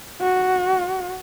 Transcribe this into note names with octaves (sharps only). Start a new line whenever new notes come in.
F#4